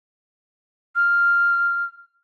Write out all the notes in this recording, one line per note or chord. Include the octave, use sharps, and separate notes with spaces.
F6